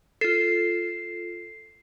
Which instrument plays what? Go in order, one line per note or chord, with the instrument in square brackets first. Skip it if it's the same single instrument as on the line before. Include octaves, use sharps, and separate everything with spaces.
[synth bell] F4 A4 [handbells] C7